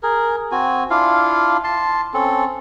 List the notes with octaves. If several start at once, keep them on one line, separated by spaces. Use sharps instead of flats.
G#4 A#4
C4 F#4 G#5
D4 E4 F4 F5
A5 C6
C4 C#4 A4